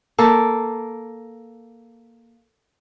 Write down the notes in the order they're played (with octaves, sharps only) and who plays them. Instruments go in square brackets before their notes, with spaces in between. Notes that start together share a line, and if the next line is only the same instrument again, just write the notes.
[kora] A#3 A4